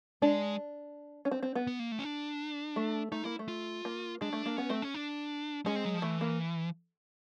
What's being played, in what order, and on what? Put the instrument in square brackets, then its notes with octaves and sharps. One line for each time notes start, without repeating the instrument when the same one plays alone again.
[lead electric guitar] G#3 [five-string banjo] D4
[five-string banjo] C#4
C4
C4
B3
[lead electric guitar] B3
A#3
A3
C#4
D4
[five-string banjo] A3
[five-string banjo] A3 [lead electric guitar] D#4
[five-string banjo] A#3 [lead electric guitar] E4
[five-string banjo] A3
[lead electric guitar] F4
[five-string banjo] A#3
[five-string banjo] G#3 [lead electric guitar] D4
[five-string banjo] A3
A#3
[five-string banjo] B3 [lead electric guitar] C#4
[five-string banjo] A3 [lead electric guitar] C4
[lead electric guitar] C#4
D4
[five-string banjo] G#3 [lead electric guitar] C#4
[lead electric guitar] C4
F#3
F3
[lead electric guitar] E3 [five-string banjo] A3
[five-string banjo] A#3